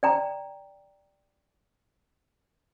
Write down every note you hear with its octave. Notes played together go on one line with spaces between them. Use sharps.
D5 G5 A#5